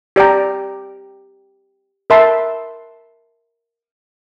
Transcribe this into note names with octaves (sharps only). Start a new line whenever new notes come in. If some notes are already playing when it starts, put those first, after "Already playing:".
G4 D5 G5 A#5
A#4 E5 A5 C6